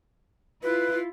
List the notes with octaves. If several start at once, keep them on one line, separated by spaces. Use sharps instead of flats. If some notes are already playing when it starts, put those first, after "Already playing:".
E4 F4 B4